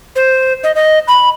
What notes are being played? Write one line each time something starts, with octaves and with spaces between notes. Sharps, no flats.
C5
D#5
D#5
B5